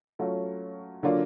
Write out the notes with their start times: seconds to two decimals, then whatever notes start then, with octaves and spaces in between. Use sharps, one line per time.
0.19 F#3 A3 C#4 F4
1.03 D3 F#3 A#3 D4 F4